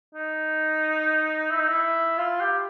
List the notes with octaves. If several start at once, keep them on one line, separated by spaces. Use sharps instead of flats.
D#4
E4
D#4
E4
F4
G4